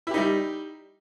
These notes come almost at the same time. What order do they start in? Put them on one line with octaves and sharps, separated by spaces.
E4 G4 D#4 G3